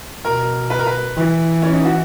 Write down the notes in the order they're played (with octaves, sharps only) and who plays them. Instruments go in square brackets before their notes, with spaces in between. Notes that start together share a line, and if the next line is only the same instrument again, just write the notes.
[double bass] B2 [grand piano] A#4
[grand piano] B4
A#4
B4
[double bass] E3
[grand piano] C#4
D#4
F#4